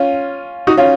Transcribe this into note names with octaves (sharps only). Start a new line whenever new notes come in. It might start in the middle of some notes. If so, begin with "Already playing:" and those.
Already playing: C#4 F4
D#4 F#4
C#4 F4